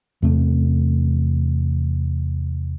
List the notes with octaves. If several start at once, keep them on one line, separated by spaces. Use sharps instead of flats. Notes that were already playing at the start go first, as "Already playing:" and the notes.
E2 C3 A3